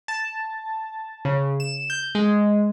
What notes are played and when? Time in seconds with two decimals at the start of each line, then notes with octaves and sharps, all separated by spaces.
0.08 A5
1.25 C#3
1.60 E7
1.90 G6
2.15 G#3